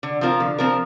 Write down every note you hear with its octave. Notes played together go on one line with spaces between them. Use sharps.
D3
F3 C4 F4 A#4
D3
F3 C4 F4 A#4